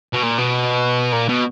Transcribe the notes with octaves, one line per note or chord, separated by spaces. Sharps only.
B2
A#2
B2
A#2
B2